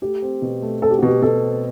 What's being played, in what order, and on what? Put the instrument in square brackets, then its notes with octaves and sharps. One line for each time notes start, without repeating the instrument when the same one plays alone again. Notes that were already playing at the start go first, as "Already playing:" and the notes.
[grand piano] A3 [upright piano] G4
[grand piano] C4
B2
A3
[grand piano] C4 [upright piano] A4
[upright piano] G4
F#4
[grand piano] B2 [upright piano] G4
[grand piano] B2 [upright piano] A4
[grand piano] C4